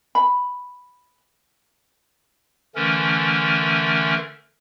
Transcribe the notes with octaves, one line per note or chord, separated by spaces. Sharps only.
B5
D3 E3 A3 C#4 A#4